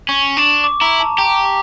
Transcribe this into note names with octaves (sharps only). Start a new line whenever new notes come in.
C#4 C#6
D4
D6
E4 A#5
A5
G4 A#5
D6